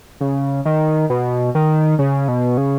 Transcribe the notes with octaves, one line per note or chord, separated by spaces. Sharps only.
C#3
D#3
B2
D#3
C#3
B2
C#3